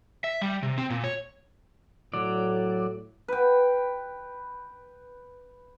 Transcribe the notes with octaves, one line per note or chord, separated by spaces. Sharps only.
E5
G3
C3
C4
A#2
C#5
A2 F#3 D5
B4 G5